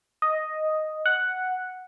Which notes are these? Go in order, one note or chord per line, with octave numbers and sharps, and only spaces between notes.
D#5
F#5